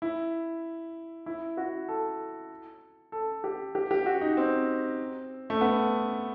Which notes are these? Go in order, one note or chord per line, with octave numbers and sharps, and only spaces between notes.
E4
E4
F#4
A4
A4
G4
G4
G4
F#4
D#4
C4
A3
B3